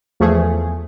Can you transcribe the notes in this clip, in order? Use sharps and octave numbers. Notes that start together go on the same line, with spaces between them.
E2 F3 A3 G#4